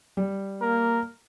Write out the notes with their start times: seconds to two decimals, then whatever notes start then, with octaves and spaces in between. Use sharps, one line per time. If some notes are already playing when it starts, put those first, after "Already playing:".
0.17 G3
0.62 A#3 A#4